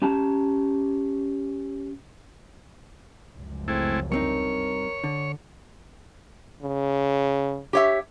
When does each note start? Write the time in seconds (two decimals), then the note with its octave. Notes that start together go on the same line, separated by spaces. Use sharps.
0.02 C#4 G4 A5 A#5
3.34 F1 C#2 F#2
3.68 G#3 A3 C4 E4
4.12 G2 C4 D#4 A#4 C#5
5.04 D3
6.62 C#3
7.73 G4 C#5 E5